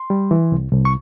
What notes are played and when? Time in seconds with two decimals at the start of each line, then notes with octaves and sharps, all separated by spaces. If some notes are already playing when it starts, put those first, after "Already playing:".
Already playing: C6
0.10 G3
0.31 E3
0.52 C2
0.72 C2
0.85 C#6